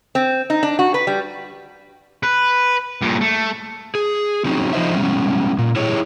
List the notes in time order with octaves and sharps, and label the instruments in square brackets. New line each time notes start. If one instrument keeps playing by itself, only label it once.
[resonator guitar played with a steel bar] C4
D#4
D4
F#4
B4
G3
[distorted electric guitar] B4
G2 A#2
A3
[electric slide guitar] G#4
F#3 C4 C#4 D#4
F3 D4 D#4 C5 D#5 E5
G3 G#3 B3 C#4
A#2
E4 G4 G#4 C#5